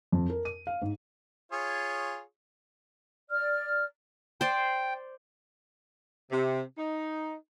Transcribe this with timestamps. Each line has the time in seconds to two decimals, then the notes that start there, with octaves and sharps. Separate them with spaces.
0.12 F2
0.30 A#4
0.45 D#7
0.67 F5
0.82 G#2
1.52 F4 G#4 C#5
3.30 D5 F6
4.41 C5 D5 G5
6.31 C3
6.77 D#4